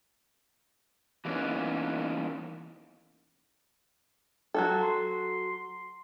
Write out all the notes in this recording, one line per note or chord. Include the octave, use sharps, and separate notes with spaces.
E3 F#3 A#3 B3 C#4 D#4
F#3 F#4 A4
C6